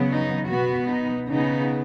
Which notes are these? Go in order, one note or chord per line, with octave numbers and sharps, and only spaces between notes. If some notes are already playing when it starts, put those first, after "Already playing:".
Already playing: C#3 F#3 B3
D#4
B2 B3 F#4
D#4
C#3 B3 D#4